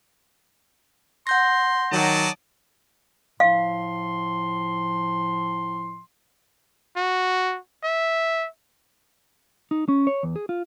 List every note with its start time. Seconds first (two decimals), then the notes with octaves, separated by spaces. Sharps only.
1.27 F#5 C6 G6 A#6
1.92 D#3 F#3 D5 D#5 A5
3.40 A2 F3 F5 C6
6.96 F#4
7.84 E5
9.71 D#4
9.88 C#4
10.07 C#5
10.23 E2
10.36 G#4
10.49 F4